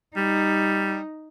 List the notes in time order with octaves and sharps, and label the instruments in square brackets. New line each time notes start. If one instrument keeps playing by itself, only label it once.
[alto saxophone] G3 [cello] D#4